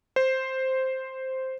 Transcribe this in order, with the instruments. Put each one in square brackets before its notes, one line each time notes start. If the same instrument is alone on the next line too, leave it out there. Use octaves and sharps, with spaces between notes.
[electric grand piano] C5